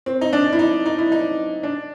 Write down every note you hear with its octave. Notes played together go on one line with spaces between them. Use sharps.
C4
D#4
D4
E4
D#4
D#4
E4
D#4
D4